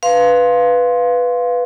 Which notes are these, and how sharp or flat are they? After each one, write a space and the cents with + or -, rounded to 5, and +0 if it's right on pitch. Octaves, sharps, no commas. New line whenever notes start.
B4 +5 F5 +0 C6 +5